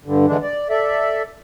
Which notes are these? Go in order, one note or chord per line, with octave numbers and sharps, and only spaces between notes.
G2 D3
D3 E3 G#3 D4
D5
A4 D5 E5